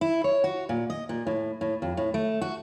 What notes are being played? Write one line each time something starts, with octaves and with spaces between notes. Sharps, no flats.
E4
C#5
F#4
A#2
D#5
A#2
A2
A2
F2
A2
A3
F#4